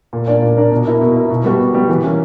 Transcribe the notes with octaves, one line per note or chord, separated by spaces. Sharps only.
A#2
A#3 D4 A#4 D5
A#2
A#3 D4 A#4 D5
B2
A#3 E4 A#4
B2
A#3 E4 A#4
B2
G3 B3 F#4
B2
G3 B3 F#4
E3
A#3 C#4